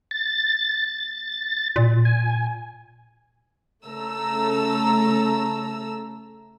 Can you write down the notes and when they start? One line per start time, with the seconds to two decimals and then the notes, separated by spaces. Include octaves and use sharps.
0.11 A6
1.76 A#2
2.05 G#5
3.85 C#3 A3 A4 A#5 E6